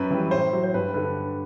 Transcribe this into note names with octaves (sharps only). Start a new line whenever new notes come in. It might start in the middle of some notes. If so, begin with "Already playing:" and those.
Already playing: F#2 B4
E3 G3
A2 C5
F#3
C5
G2 B4
D3 B4